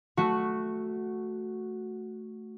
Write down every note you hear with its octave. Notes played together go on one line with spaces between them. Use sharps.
A3 F#4